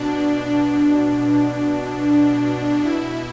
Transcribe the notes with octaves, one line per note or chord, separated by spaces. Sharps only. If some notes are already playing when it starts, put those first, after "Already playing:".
Already playing: B2 D4
D4
B2
B2 E4